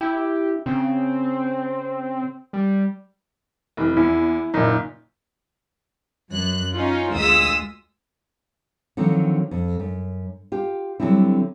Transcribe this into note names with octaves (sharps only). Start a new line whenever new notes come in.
E4 G4
C#3 C4
G3
F1 E3
E2 E4
F#1 A#2 D#4
F#2 F#6
C#4 D#4 F4
D2 G#3 F4 D#6 E6 B6
D3 D#3 F3 F#3 C4
F2
F#2
F4 G4
D3 F#3 G3 C4 D#4 E4